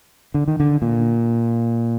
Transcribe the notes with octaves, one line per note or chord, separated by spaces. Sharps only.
D3
D#3
D3
A#2